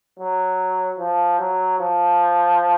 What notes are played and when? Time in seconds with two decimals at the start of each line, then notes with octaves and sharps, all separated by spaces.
0.19 F#3
0.98 F3
1.39 F#3
1.79 F3